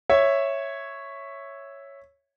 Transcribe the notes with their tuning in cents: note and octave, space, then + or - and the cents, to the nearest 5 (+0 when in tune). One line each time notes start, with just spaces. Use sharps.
C#5 -5 E5 +0